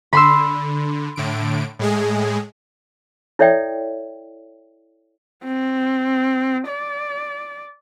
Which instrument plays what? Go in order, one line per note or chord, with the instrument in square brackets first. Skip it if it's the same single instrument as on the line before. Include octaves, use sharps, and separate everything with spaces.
[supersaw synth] D3 [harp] B5 C6 E6
[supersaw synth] A2 D3 D7
A2 G#3 G#4
[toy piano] E4 A4 C#5 D5 E5 G5
[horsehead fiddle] C4
D5